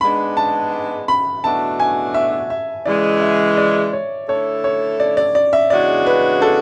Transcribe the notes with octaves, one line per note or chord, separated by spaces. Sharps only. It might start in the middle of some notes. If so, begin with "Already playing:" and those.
G#2 G#3 B3 D4 B5
A5
B5
E2 B2 A3 D4 F#4 A5
G#5
E5
E5
C#3 E3 G#3 D5
E5
D5
C#5
D3 A3 E4 A4 C#5
C#5
D5
D5
D5
E5
E2 C#3 G#3 D4 F#4 D5
B4
A4